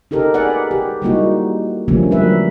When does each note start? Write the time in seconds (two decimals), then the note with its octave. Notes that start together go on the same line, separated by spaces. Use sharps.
0.11 D#4 G4 A4 A#4
0.34 G#4 B4 D5 F#5
0.71 G4
1.02 G3 G#3 A#3 D#4 E4 F#4
1.88 D3 F3 G3 A3 A#3 C#4
2.11 F#3 G3 A#4 B4 E5